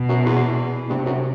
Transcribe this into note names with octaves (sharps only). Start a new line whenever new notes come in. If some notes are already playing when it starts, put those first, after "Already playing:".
Already playing: B2
F#2
E2
G2 C3
F#2